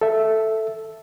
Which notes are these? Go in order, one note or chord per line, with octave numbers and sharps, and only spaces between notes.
A4 E5